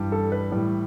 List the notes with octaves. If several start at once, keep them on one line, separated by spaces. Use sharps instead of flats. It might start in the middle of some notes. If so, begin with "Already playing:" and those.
Already playing: G2 E3 G3
A4
B4
A2 E3 G3